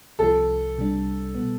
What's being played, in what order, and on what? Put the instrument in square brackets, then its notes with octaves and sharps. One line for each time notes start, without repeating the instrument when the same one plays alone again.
[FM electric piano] C2 C3 F3 [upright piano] A4
[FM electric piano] C2 C3 G3 D4
B2 G3 B3